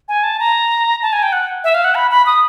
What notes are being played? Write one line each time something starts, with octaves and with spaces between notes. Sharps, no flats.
G#5
A5
A#5
A5
G#5
G5
F#5
E5
F5
F#5
B5
B5
D#6